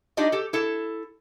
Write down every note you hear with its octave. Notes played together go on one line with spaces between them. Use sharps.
D4 D#4 F4 G4 D#5
G4 A4
E4 A4